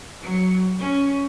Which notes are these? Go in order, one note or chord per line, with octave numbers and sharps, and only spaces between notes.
F#3
C#4